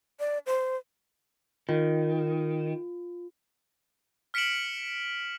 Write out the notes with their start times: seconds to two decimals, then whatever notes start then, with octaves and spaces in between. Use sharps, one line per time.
0.20 D5
0.46 C5
1.69 D#3 F4
4.34 F6 B6 C#7 D7 E7 F#7